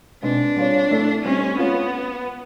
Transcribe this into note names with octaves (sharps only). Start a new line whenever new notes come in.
B2 G#3 C4 D4 D#4
G3 C4 F4 G#4 C#5
A3 C4 E4 A4 D5
G3 C4 C#4 D#4 G4 C5
G#3 B3 C#4 F4